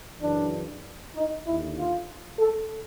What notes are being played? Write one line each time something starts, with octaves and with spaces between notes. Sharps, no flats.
F#2 C#3 E3 D4
D#4
D#2 D3 E4
F4
A4